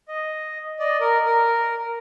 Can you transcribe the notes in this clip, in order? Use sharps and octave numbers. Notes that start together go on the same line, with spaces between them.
D#5
D5 D#5
A#4
A#4